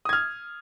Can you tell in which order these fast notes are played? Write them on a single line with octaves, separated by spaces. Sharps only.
D#6 G#6 F6